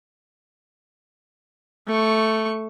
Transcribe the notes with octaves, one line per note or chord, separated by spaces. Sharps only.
A3 C#6